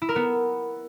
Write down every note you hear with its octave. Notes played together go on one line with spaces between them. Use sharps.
E4
A#4
B3